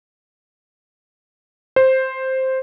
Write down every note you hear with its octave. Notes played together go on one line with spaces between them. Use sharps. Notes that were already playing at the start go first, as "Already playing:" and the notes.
C5